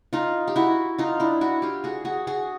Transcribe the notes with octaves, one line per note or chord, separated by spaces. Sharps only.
D#4 F4
G4
E4 F#4
D#4 F4
D4 E4
E4 F#4
F4 G4
F#4 G#4
F#4 G#4
F#4 G#4